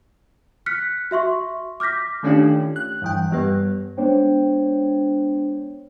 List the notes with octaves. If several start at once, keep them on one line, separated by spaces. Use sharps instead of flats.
F6 F#6 B6 C#7
F#4 E5 C6 C#6
D6 F6 G6 A#6 B6
D#3 A3 C#4 D4 F4 G4
F#6
G2 E3 G5
G2 G3 B3
G#3 B3 D4 C5 C#5 G5